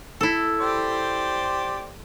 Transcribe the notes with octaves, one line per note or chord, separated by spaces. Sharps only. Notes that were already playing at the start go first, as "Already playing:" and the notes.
E4 A4
G4 C5 D5